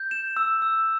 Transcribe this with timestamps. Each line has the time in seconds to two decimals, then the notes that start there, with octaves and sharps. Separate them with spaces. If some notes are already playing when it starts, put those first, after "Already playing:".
Already playing: G6
0.11 E7
0.37 E6
0.62 E6